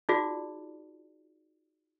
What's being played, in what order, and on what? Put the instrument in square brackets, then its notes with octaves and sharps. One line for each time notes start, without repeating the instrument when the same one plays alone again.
[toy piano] D#4 F4 F#4 G#4 D5